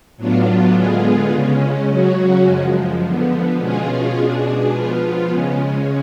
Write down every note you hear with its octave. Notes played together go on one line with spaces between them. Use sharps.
A2 F#3 B3 D4 F4
D3 G#3 B3 F4 G#4
C#3 G#3 C#4
C#3 F#3 C#4 F#4
F#2 F3 G#3
D3 F3 B3
B2 G#3 C#4 F4 G#4
B2 G#3 D4 G#4
F3 B3 F4
C#3 G#3 C#4